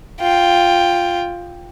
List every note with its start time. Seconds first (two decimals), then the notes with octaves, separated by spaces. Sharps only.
0.20 F4 G5